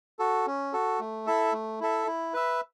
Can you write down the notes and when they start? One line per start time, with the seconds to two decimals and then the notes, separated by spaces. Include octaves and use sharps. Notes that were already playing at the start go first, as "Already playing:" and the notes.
0.19 F#4 A4
0.46 C#4
0.73 F#4 A4
1.00 A3
1.27 E4 A4 E5
1.53 A3
1.80 E4 A4 E5
2.07 E4
2.34 B4 E5